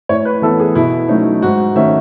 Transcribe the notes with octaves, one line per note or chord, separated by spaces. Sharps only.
A2 C#5
B4
E3 B3 A4
G#4
B2 E4
F#3 A3 C#4 D#4
G#2 F#4
D#3 A3 C#4 E5